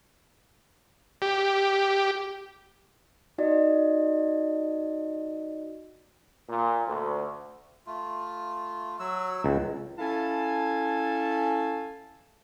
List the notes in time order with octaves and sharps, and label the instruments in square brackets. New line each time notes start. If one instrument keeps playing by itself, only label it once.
[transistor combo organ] G4
[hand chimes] D#4 F#4 D5 D#5
[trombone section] A#2
D2
[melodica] A3 F4
F#3 E6
[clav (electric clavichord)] C#2
[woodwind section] C#4 E4 A4 F5 G#5 A5